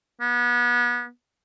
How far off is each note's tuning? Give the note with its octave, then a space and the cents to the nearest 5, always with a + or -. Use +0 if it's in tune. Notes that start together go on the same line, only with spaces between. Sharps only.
B3 -30